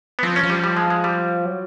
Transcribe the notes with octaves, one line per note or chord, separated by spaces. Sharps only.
B3
F3 C4
C#4
F3
G3
G3
G#3
G#3
G3
F#3